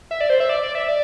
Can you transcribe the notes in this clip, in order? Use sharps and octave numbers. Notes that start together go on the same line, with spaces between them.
E5
D5
C5
E5
D5
D5
E5
D5